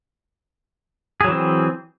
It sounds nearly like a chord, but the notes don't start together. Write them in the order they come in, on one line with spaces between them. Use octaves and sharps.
G#4 F#3 E3 C4